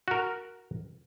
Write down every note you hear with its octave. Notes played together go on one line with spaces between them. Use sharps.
F#4 A#4